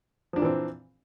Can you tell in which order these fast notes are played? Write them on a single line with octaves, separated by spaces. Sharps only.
F3 D4 A#2 E3 C4